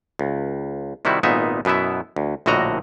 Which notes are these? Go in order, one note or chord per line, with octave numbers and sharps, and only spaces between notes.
C#2
C3 D#3 G3 E4 F#4
G#1 A#2 B3 D#4 E5
F#2 B2 B3 E4 E5
D2
A#1 A2 D3 F#4 D#5 A#5